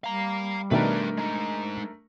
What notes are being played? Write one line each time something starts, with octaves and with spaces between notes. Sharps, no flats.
G3 F5 A#5
B2 D#3 A3 D4 A#4 B4 D5 E5
G#3 D#4